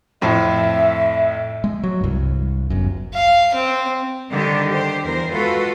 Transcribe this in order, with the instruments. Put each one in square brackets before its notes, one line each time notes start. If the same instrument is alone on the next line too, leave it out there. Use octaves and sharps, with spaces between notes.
[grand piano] F2 A2 F3 [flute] E5
[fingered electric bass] G#3
F#3
C2 G2
G1 F#2
[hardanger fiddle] F5
C4
[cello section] D3 D#3 G3 G4
G4 C5
E2 A#4 C5
G#3 F4 F#4 A4 B4